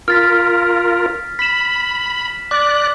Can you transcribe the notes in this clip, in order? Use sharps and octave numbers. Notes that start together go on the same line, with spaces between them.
F4 A#4 F6 A6 B6
B5 B6 E7
D5 D6 F#6